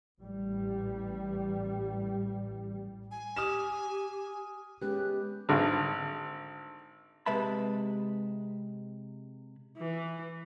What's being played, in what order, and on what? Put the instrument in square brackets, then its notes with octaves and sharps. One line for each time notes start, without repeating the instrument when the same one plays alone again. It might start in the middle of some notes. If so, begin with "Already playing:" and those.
[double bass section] A1 G3
[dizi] G#5
[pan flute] G4 [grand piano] D#6 F6 E7
[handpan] G#3 C#4 G4 [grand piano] B3 [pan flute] F#6
[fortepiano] G#1 D3
[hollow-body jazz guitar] C3 G#3 B4 E5 A5 B5
[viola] E3